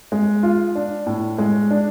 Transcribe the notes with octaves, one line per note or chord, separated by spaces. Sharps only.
G#3
F4
D4
A2
G#3
D4